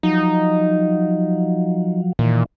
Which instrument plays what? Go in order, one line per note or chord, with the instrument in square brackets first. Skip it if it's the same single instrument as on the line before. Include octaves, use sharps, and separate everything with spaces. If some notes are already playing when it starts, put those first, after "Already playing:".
[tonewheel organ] F3 F#3 [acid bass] D#4
[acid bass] A#2 [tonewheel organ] D#3 E3